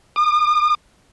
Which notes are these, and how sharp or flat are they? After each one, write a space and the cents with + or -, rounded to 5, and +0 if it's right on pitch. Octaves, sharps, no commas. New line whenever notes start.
D#6 -45